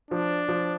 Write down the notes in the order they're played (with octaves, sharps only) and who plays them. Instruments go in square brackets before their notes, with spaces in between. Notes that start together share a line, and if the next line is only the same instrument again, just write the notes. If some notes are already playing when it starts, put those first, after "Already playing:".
[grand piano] F3 [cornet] D4
[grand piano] F3